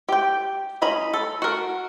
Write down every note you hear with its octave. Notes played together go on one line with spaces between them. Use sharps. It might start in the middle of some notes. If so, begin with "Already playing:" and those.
G4 G5
C#4 D#5 A#5 B5
A4
F#4 A#4